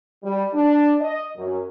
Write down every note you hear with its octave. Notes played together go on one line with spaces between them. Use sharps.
G3
D4
D#5
F#2